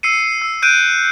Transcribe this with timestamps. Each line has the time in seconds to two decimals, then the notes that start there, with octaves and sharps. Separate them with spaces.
0.03 E6 C7 C#7 D#7
0.42 E6
0.62 F#6 G6 D7 D#7